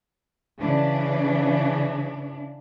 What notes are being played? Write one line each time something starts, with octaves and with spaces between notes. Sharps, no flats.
C#3 E3 D4